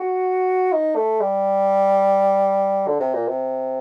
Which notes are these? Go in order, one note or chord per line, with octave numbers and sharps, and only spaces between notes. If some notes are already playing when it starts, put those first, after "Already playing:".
Already playing: F#4
D#4
A3
G3
D3
C3
A#2
C3